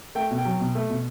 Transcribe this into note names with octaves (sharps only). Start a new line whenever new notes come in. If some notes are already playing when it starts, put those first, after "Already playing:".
A3 G5
B2
G5
F#3
B2
A3
B2